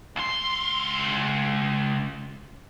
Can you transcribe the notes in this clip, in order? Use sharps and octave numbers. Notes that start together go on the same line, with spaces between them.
C#2 C6